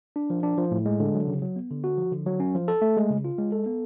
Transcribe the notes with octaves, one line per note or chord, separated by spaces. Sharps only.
D4
F3
D4
F3
A2
G#3
D3
F#3
C#3
F#3
B3
D3
F#4
F3
D3
F#3
C#4
F3
A4
A3
G#3
C#3
F4
G#3
A4
B3